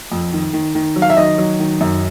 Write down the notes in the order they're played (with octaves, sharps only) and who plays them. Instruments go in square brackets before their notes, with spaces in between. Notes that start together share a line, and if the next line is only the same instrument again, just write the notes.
[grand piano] F2
D#3
D#3
D#3
F#3
[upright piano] F5
E5
[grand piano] D#3 [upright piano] D#5
[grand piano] F#3
D#3
F#2